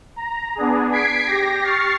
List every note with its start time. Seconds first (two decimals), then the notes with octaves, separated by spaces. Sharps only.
0.16 A#5
0.55 B3 D4 G#4
0.92 G#6 B6 C7 D7
1.26 G4 A#6
1.62 C#6 F6 A6 C7